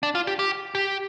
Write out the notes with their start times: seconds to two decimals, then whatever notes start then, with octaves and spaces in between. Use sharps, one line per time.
0.03 D4
0.15 F4
0.27 G4
0.39 G4
0.75 G4